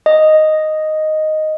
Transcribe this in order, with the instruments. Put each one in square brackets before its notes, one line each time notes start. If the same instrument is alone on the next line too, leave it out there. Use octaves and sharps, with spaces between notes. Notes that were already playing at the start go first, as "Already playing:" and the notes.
[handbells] D#5